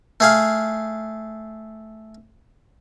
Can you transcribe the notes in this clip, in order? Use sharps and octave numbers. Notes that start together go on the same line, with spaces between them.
A3 G#4 F5